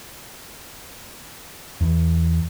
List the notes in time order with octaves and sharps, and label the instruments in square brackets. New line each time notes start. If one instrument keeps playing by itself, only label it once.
[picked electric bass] E2